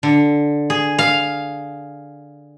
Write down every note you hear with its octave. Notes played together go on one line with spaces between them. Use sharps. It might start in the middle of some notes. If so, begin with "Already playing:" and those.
D3
G#4
F5